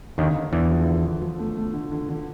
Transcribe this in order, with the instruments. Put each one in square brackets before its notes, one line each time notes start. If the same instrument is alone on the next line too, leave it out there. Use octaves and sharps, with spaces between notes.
[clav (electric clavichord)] D#2 D#3 [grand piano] D3
[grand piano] D3
[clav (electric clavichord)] E2 E3 [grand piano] D3
[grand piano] F3
D3
D3
F3
A3
A3
D3
D3
D3